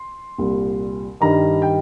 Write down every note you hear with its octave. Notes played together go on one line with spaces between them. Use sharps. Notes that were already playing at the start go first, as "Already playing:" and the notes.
Already playing: C6
C2 A#2 G3
G2 D#3 G3 A#5
G5